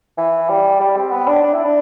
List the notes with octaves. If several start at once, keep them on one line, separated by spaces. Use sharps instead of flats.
E3
G3
G3
C4
B3
D4
D4
E4
D4